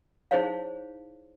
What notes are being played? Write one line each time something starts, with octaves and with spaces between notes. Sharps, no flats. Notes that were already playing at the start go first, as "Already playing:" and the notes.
D#4 E4 G#4 C5 C#5 F5